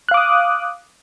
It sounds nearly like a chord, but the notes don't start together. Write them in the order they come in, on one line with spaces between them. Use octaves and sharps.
F#6 F5 D6 D#6